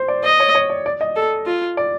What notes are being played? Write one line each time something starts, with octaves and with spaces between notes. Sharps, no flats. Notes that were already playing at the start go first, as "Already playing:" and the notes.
Already playing: C5
D5
C5 D#5
C#5
C#5
D5
D5
D#5
A4
F4
D5